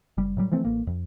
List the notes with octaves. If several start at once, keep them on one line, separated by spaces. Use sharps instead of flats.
F#1 G3
A2 F#3 G3
E3 F3 A3 C4
A1 A#3
F2